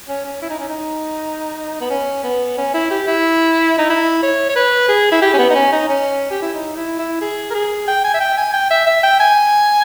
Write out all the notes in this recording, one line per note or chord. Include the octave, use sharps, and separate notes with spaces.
C#4
C#4
E4
D#4
C#4
D#4
B3
C#4
B3
C#4
E4
G4
E4
D#4
E4
C#5
C#5
B4
G#4
E4
G4
C#4
B3
D#4
C#4
D#4
C#4
G4
E4
D#4
E4
E4
G#4
A#4
G#4
G5
G#5
E5
G5
G#5
G5
E5
E5
G5
G#5